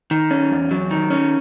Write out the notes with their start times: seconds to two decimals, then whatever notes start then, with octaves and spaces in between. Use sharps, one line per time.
0.11 D#3
0.31 C#4
0.51 E2
0.71 F#3
0.91 D#3
1.10 C#4